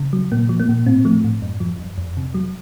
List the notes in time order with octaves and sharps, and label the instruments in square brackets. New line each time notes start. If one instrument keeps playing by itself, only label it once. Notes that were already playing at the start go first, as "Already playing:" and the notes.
Already playing: [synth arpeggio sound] C#3
F#3
A#2 A#3
F3
A#3
A#2
A2 C4
F3 A3
A2
F#2
F3
F#2
F2
C3
F#3